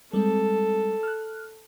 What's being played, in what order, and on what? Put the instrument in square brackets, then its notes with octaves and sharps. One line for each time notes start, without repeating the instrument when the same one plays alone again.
[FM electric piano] G3 G#3 C4 [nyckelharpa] A4
[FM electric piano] F6 F#6